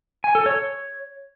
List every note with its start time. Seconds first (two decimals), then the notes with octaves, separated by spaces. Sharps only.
0.24 G#5
0.35 A4
0.46 C#5